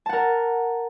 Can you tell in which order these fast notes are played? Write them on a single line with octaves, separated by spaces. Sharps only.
A5 F#5 A#4